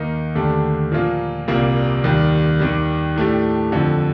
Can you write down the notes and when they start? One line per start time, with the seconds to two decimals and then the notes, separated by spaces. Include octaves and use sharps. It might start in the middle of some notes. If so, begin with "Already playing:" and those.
Already playing: D#2 D#3 A#3 D#4
0.35 D#2 D3 A3 D4 G4
0.92 A#2 F3 A#3 F4
1.48 C2 A#2 G3 A#3 F4
2.04 D#2 D#3 G3
2.60 D#2 D#3 G3
3.16 A2 A3 D4 G4
3.72 F2 D3 F3